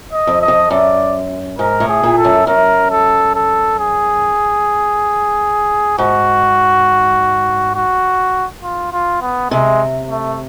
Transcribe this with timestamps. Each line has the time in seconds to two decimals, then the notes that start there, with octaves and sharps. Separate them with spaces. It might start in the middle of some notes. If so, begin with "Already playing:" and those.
0.13 D#5
0.27 F2
0.41 D#5
0.48 F2
0.71 F#2 D5
1.59 G#2 A#4
1.80 A2
1.88 G#4
2.03 A#2
2.17 A4
2.24 F#2
2.47 F#2 A#4
2.91 A4
3.35 A4
3.79 G#4
5.98 G#2 F#4
7.75 F#4
8.63 F4
8.93 F4
9.21 B3
9.51 C3 G#3
10.09 A3